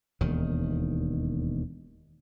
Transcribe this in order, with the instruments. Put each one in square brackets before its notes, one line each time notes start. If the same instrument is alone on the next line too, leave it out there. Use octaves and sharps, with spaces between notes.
[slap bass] E1 D#2 D#3